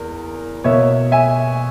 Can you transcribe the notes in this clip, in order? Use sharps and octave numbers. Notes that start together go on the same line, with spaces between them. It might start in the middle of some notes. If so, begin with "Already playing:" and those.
Already playing: E2 A#4
B2 A#3 C#5 E5
E5 G#5